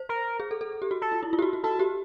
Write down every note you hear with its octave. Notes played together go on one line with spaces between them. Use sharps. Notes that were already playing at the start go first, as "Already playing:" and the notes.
Already playing: C5
A#4
G#4
A4
A4
G4
F#4
A4
F4
E4
F4
G4
F#4
F#4
F#4 A4
G4